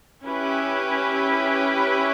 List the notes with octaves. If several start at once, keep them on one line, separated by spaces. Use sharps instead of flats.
C#4 E4 G4 B4